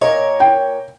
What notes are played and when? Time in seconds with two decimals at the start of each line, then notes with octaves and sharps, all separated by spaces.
0.01 A#2 A#4 C#5 D#5
0.40 G5